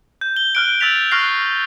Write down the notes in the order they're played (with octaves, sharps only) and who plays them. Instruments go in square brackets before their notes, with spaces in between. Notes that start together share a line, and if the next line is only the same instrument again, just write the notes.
[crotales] G6
G7
F6 F#6 D7
E6 G6 A6 B6 F7
C#6 F6 F#6 A#6 C7